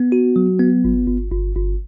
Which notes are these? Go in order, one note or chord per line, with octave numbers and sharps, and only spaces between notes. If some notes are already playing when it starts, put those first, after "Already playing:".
Already playing: B3
F#4
F#3
B3
G1
G1
G1
G1